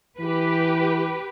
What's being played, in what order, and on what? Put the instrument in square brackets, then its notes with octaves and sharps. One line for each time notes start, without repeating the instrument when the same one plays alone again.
[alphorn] E3 [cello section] G4 B4